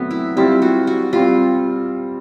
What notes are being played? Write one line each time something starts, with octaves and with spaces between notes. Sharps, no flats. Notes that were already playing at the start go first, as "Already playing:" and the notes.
Already playing: D3 F#3 A3 B3 C4
E4
G3 C4 E4 F4
F#4
F#4
G3 C4 F4